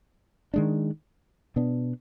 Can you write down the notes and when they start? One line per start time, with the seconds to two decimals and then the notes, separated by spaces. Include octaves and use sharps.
0.54 D#3 G#3 D4
1.56 B2 B3 D4